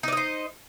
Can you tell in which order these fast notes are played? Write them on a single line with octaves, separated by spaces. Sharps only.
D#4 D5 D#5 C5